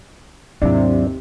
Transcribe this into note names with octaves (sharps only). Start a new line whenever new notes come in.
D#2 G#2 C3 F#3 D4 E4